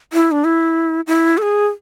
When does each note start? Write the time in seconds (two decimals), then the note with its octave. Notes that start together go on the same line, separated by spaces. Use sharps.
0.13 E4
0.31 D4
0.44 E4
1.07 E4
1.38 A4
1.42 G#4